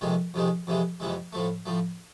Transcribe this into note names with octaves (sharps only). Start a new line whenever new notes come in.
F2 C3 D#3 G#3
F2 C3 D#3 G#3
F2 C3 E3 G#3
F2 C3 E3 G#3
A2 F3 A3
A2 F3 A3